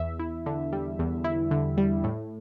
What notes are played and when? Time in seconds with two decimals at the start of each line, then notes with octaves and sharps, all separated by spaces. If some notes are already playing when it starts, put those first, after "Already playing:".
Already playing: E2 E5
0.19 E4
0.46 D3
0.73 G3
0.99 E2
1.24 E4
1.51 D3
1.78 G3
2.04 A2